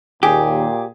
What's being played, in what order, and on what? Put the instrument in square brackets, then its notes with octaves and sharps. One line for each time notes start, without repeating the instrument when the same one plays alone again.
[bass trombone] D#2 [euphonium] A#2 [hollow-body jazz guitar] G4 [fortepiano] G#4